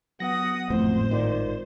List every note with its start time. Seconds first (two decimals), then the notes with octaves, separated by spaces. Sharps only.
0.20 F#3 B3 F#5 D#6 A#6
0.70 G#1 F2 A2 C5
1.11 G#1 D#3 F4 D5